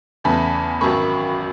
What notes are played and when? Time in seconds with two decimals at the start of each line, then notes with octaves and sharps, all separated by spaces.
0.24 E2 C#3 E3 A3 A5 B5
0.81 G#1 F#2 D#3 B5 C#6